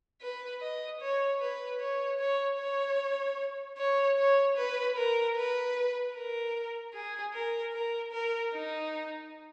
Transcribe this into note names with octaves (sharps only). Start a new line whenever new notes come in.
B4
D#5
C#5
B4
C#5
C#5
C#5
C#5
C#5
B4
A#4
B4
A#4
G#4
A#4
A#4
A#4
D#4